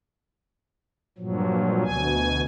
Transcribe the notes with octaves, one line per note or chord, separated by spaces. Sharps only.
G2 A#2 F3 F#3
D2 B2 G#5